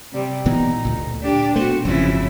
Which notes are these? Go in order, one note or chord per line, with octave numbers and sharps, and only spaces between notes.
C3 G3
A#2 E3 B3 D#4
D2 A#2
D4 G4
B2 A3 F#4 C5
G1 F2 C#3 F3 E4